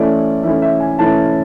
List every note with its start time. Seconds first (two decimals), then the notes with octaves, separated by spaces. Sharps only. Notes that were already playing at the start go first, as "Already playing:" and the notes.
Already playing: E3 A3 C#4 E4 D5
0.43 E3 A3 C#4 E4 E5
0.62 E5
0.80 G#5
0.99 E3 A3 C#4 E4 A5